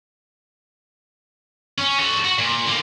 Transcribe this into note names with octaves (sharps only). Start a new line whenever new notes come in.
C#4
F#4 A4
F#4
A#2
D3 A#3